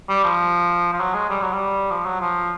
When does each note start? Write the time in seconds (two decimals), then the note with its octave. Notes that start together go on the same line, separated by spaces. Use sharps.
0.09 G3
0.24 F3
0.93 F3
1.00 F#3
1.14 G#3
1.30 G3
1.41 F#3
1.52 G3
1.91 F3
2.06 F#3
2.21 F3